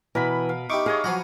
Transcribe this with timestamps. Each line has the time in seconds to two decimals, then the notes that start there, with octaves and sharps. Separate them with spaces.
0.15 B2 E3 A#4 B4 B5
0.49 F5
0.70 D#4 E4 G4 C#6 D6
0.86 G#4 C#5 D#5 F5
1.04 F3 F#3 F#4 B4 G#5 A#5